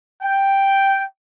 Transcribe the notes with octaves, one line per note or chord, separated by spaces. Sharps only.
G5